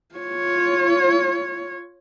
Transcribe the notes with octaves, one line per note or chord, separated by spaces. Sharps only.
F4 C#5